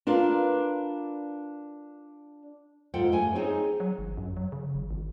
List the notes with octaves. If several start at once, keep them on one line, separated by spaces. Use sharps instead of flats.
D4 F4 A#4 B4
G#2 F4 A4 F#5 G5
G2 A3 G#5
C4 D#4 G#4 C#5
F#3
G#1
F#2
F#3
C#3
G#1
G#1